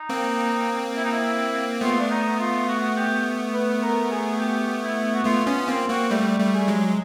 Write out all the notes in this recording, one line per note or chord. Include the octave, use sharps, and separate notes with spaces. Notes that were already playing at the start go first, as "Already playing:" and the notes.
Already playing: D#4
A#3 C4
E4
D#4
E4
A3 B3 F4
D4
D#4
F4
F#4
G4
B4
A#4
G#4
G4
E4
F#4
A3 B3 F4
B3 C#4 F4
A#3 C4 F4
A#3 C4 F#4
G3 A3 G4
G3 A3
G#4
F#3 G#3